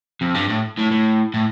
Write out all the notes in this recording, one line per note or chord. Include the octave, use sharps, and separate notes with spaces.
F2
G2
A2
A2
A2
A2